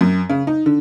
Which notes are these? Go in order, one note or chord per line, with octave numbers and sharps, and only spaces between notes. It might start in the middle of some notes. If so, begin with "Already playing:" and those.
F#2
C#3
D#4
D3